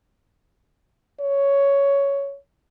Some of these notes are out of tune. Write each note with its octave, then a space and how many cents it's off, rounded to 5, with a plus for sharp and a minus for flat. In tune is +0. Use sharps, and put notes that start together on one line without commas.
C#5 +10